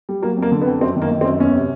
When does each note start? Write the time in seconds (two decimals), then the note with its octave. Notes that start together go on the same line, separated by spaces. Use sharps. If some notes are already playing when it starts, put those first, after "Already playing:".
0.09 G3
0.22 F#3 A#3
0.37 F2
0.42 A#3
0.52 D3
0.61 B3
0.66 F2
0.81 F#2 C4
0.96 D#3
1.02 A#3
1.11 D#3
1.21 C4
1.25 F#2
1.40 E2 C#4
1.55 C3